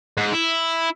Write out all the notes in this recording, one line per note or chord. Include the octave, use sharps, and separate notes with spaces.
G#2
E4